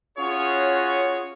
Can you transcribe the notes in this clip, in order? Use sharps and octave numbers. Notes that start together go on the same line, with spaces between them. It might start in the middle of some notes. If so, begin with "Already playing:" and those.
C#4 F4 F#4 G#4 C#5